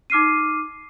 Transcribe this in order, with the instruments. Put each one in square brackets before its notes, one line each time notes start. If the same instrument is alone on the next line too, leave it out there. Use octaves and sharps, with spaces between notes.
[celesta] D#4 D6 F6 C7 D#7